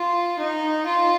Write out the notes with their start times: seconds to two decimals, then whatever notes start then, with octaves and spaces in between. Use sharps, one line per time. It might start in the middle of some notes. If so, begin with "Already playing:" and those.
Already playing: F4
0.39 D#4
0.86 F4